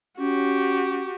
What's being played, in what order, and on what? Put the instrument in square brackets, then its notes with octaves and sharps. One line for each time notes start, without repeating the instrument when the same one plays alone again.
[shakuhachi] C#4 [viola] F#4 G4